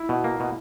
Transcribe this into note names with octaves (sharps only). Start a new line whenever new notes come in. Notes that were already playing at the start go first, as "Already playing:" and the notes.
Already playing: E4
B2
A#3
B2